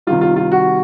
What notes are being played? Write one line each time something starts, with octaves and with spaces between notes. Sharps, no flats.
C3 D#3 G3 F4
F4
F4
F#4